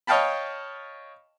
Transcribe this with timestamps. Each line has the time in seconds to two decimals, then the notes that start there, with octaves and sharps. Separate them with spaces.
0.07 C#5 D#5 F5 G5 A5 B5